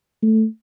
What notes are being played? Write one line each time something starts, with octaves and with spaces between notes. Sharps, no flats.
A3